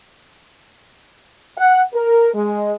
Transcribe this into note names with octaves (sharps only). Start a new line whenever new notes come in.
F#5
A#4
G#3